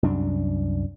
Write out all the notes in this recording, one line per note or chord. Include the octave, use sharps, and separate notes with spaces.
C2 F#2 D4